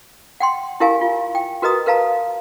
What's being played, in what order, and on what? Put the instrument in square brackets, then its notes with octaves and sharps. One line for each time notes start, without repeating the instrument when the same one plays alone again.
[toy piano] F#5 G5 C6
E4 G4 A#4 F5 G#5
F4
G5
F#4 A#4 B4 D#5 A#5 D#6
A#4 B4 F5 A5 A#5